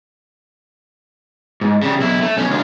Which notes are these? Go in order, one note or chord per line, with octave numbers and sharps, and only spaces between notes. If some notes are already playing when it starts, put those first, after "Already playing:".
G#2
C#3 G3
B1 E4
A3
B1 C#4
D2 F4